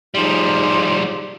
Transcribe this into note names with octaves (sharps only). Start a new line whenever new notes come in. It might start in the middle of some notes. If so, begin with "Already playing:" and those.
F3 G3 D#4 G#4 C6